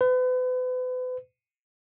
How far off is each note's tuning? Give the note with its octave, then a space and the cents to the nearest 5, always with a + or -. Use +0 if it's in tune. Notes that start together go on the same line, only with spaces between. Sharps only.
B4 +40